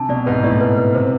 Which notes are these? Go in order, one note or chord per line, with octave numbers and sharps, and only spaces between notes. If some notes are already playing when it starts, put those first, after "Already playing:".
Already playing: C3 D4 A5
B2 D5
G#2 B4
A2 D5
B4
B4
C3 C5